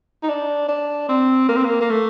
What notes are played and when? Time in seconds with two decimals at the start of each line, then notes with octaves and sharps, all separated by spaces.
0.23 D#4
0.29 D4
0.69 D4
1.09 C4
1.48 A#3
1.57 C4
1.64 A#3
1.81 A#3
1.90 A3